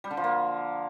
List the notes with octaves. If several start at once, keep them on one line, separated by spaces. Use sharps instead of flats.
G3
D3
F3
A#3